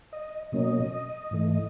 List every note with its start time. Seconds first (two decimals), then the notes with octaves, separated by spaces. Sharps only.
0.13 D#5
0.52 B2 F#3 A#3 C#4 D#5
1.31 G#2 E3 A3